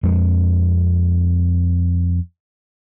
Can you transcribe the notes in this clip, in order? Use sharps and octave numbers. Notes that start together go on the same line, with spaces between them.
F2 G#3